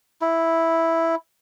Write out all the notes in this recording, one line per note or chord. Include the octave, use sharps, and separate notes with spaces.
E4